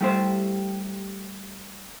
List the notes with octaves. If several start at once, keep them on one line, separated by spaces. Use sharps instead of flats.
G3 A3 E4 G4 C5